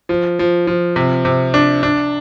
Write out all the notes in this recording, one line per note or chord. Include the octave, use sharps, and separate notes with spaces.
F3
F3
F3
C3
C3
D4
D4